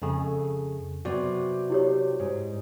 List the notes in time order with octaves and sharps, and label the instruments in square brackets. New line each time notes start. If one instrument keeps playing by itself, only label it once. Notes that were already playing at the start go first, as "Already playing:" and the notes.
[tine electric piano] F2 C#3 [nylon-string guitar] A3 G#4
[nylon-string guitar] C3 F#3 B3 [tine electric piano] F#4 D5
[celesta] E4 G4 C#5
[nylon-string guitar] G#2